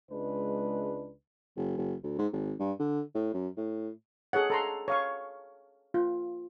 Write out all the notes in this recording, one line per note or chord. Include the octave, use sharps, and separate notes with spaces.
C#2 G#3 D4 B4
F#1
F#1
D2
G#2
G#1
G2
D3
A2
F#2
A2
G#4 A4 C#5 F#5
A4 A#5 C6
C#5 F5 C#6
F4